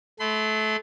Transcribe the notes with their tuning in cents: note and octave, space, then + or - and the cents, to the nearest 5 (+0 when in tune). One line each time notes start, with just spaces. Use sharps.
A3 -25 C6 -45